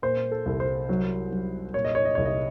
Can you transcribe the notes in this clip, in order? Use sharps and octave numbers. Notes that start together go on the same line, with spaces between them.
A#2 C5
A4
C2
C5
F#3
F#3
A#2 C#5
D#5
C#5
D#5
C2 C#5
D#5